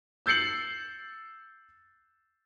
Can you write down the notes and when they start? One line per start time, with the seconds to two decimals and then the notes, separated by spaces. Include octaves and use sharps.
0.26 E6 G6 A6 C7 C#7 F#7